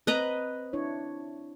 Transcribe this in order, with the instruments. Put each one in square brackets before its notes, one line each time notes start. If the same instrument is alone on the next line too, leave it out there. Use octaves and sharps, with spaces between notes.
[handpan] C4 [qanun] B4 D#5 A#5
[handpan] D4 E4 C#5